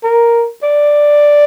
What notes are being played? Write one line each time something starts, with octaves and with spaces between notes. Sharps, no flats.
A#4
D5